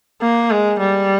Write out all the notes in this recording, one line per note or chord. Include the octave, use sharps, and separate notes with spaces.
A#3
G#3
G3